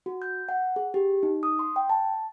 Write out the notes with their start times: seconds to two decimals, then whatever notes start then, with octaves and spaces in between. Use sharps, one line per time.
0.06 F#4
0.22 G6
0.49 F#5
0.76 G#4
0.94 G4
1.23 D#4
1.43 D#6
1.59 C6
1.76 G5
1.90 A5